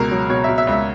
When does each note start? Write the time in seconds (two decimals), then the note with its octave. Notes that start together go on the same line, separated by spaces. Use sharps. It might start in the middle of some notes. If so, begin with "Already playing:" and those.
Already playing: C#2 B2 G#4 A#4
0.11 F#3
0.29 B2 C#5
0.44 B2 E5
0.58 E5
0.67 C#2
0.72 E5